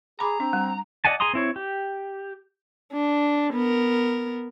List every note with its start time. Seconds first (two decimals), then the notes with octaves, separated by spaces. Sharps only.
0.20 G#4 A#5 B5 D6
0.40 C4 D4
0.53 G3
1.05 D5 D#5 F#5 G#5 A5
1.20 G#4 G#5 A#5 C6 D#6
1.33 C4 E4 C#5
1.56 G4
2.92 D4
3.53 B3 A#4